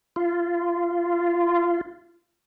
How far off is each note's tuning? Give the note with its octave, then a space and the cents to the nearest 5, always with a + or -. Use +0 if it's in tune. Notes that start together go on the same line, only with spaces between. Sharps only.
F4 -20